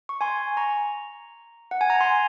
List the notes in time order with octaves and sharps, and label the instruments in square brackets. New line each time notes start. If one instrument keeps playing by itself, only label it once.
[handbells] C#6
G#5 C6
A#5 C#6
F#5
G#5
A#5
G#5 C6